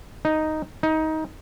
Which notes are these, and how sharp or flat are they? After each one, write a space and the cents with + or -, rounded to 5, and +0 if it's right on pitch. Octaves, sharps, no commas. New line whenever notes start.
D#4 +0
D#4 +20